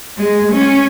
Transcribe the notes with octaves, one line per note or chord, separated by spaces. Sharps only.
G#3
C#4